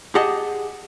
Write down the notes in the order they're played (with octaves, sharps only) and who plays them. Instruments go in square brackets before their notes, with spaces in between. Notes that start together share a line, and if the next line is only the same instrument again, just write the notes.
[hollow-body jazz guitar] G4 G#4 D#5 F#5 A5